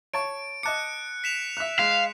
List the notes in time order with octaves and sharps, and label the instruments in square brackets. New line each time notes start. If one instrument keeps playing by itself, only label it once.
[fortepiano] C#5 A5 C#6 [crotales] D7
[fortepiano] D#5 A5 D6 [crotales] F#6 C#7
[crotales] B6 E7 F7
[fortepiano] E5 F#6
[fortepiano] G#3 [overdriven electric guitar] F5